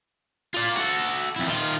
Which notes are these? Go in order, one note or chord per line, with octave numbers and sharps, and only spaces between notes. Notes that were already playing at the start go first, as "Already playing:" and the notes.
F4 D5
F#4 A4
F2 E4
D#3 F4